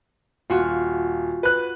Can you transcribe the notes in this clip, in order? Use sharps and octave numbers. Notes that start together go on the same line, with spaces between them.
D#1 F4 F#4
B4 F#6